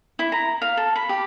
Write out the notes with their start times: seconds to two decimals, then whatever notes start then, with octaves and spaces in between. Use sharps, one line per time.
0.19 E4
0.32 A#5
0.62 F5
0.77 A4
0.96 B5
1.09 G4